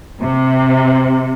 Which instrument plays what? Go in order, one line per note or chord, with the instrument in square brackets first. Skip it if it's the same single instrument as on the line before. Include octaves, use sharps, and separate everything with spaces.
[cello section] C3